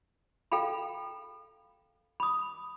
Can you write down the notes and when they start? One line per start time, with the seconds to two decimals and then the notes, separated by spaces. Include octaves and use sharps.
0.52 A4 F5 G5 A#5 B5
2.20 B5 D#6